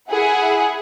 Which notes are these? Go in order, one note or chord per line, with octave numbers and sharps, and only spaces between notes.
E4 G#4 F#5